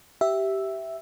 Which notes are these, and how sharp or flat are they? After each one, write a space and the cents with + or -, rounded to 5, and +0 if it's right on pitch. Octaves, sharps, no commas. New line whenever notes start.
G4 -15 E5 +0